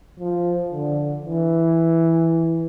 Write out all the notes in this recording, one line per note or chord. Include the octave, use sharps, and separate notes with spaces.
F3
D3
E3